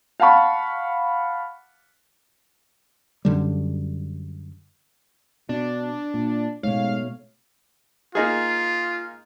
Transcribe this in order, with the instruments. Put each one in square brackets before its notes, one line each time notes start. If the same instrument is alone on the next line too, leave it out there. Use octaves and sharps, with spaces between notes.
[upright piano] F5 F#5 A5 B5 C#6
[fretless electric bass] F#2 D3 G3
[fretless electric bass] B2 [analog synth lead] D4
[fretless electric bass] A#2
[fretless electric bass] G#2 [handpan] B2 A3 C#5 [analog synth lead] F5
[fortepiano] A#3 D#4 G#4 [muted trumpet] F4